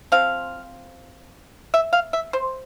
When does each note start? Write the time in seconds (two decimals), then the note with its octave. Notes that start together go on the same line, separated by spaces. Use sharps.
0.12 F3 C4 F5
1.74 E5
1.93 F5
2.13 E5
2.33 C5